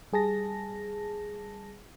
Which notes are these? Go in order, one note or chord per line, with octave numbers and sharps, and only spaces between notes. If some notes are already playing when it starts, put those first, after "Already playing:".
G3 G#4 A5 A#6